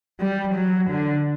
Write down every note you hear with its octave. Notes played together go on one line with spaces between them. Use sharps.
G3
F#3
D3